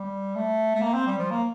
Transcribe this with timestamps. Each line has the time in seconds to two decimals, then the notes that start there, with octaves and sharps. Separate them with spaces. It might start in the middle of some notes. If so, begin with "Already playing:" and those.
Already playing: G3
0.35 A3
0.75 A3
0.82 A#3
0.94 C4
1.07 G3
1.19 F3
1.31 A#3